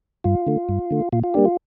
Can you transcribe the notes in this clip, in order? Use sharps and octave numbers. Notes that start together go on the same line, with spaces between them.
G2 F4
D3 A3
G2
D3 A3
A#2 F4
F4
G3 A#3 D4 G4
F4